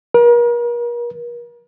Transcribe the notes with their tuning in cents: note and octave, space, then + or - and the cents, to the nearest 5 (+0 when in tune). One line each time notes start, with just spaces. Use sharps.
A#4 +40